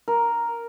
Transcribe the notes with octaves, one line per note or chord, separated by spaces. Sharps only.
A#4